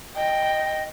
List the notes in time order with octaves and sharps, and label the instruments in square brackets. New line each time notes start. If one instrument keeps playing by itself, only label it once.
[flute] D#5 [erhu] G5